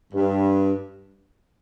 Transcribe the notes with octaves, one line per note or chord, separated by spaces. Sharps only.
G2